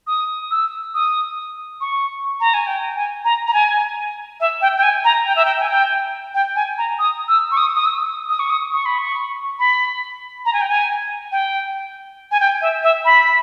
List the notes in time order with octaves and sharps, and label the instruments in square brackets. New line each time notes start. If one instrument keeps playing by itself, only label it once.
[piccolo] D#6
E6
D#6
C#6
A#5
G#5
G5
G#5
A#5
A#5
G#5
E5
G5
G5
G#5
A#5
G5
E5
G5
G#5
G5
G5
G#5
A#5
D#6
E6
C#6
D#6
D#6
E6
D#6
C#6
D#6
C#6
B5
C#6
B5
A#5
G#5
G5
G#5
G5
G#5
G5
E5
E5
B5